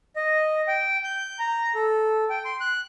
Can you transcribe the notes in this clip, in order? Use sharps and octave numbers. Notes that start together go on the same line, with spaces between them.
D#5
G5
G6
A#5
A4
G5
C6
F#6